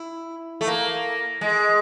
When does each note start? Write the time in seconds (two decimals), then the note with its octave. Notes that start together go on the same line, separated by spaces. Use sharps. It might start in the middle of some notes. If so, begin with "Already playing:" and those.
Already playing: E4
0.61 A3
0.67 A#3
1.41 G#3